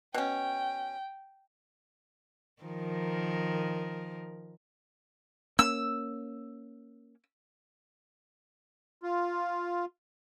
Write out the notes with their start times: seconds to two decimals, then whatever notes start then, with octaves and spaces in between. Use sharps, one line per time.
0.14 B2 C#4 G5
2.63 D#3 F3 A#4
5.59 A#3 C#4 E6
9.03 F4